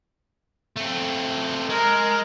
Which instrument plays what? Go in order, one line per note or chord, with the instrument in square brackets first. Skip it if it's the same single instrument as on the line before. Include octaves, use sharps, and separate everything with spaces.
[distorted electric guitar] A3 C4
[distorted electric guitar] G#3 [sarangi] A#4